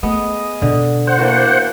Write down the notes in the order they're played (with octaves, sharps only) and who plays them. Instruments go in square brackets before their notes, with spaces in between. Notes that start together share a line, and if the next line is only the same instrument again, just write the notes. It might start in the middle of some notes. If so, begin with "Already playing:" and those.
[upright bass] A3 [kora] B3 [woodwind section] G#4 D#5 D#6
[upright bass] B2 [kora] D3
[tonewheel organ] C5 F#5
[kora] E3 F#4 [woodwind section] A#3 D4